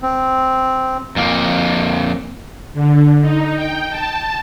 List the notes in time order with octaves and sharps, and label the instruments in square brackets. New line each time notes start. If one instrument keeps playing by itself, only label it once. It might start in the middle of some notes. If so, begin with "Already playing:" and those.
[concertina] C4
[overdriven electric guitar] F2 A#3
[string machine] D3
D#4
G5
A5